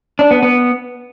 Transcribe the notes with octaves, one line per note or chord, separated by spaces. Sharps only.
D4
B3
B3